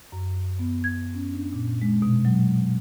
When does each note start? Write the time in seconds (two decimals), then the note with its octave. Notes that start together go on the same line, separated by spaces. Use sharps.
0.12 F#2
0.59 B3
0.84 G#6
1.14 C#4
1.33 D4
1.53 A#2
1.81 G#3
2.02 B2
2.25 F#3